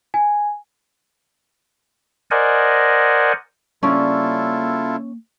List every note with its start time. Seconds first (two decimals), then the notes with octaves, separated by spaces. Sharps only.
0.14 G#5
2.31 A#4 C5 D5 D#5 F#5 G#5
3.83 C#3 G3 A#3 C#4 D4 E4 F4 A4